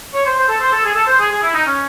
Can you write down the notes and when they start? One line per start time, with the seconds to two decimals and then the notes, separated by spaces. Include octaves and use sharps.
0.13 C#5
0.25 C5
0.37 C5
0.49 A4
0.61 C5
0.72 A4
0.84 G#4
0.95 A4
1.07 C5
1.19 G#4
1.31 G#4
1.42 E4
1.54 D#4
1.66 C#4